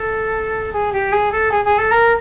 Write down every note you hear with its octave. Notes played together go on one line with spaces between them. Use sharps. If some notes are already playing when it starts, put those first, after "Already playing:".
Already playing: A4
G#4
G4
G#4
A4
G#4
G#4
A4
A#4